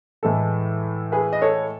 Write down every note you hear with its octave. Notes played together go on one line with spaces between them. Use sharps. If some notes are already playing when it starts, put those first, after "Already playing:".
A2 E3 G#3 A4
G#4 B4
D#5
A4 C#5